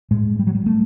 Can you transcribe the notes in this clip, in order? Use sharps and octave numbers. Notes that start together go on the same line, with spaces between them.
A2 G#3
G3
F#3
G3
A3